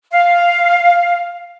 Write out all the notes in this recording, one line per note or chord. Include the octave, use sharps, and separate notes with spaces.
F5